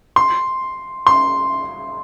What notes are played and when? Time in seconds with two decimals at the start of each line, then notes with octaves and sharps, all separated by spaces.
0.16 C6
1.07 C6